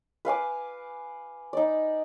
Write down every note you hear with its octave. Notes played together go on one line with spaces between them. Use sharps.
B4 F5 G#5 D6
D#4 D5